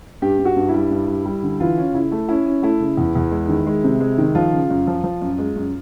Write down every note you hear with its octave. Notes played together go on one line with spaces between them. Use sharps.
G2 G4
G2
F#4
G2
E4
G3
G2
G3
G3
D3
E3 F4
C#4
C#3 E4
A3
C#4 E4
C#4
A3 E4
C#3
E2
E2
G#3
D#3
G#3
C3
G#3
D#3
F3 F4
C#3
F#2
F3
F3
F#2
G#3
F#2